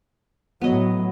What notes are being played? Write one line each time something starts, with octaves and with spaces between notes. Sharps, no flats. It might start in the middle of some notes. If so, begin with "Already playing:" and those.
A2 F#3 B3 D#5